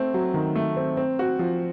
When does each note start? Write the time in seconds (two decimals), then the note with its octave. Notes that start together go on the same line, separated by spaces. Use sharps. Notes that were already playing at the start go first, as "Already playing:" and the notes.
Already playing: A3 C4
0.14 F#3
0.34 D#3
0.56 A3
0.77 C4
0.97 C4
1.19 F#4
1.39 F3